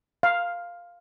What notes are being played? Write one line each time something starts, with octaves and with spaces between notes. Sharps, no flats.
F5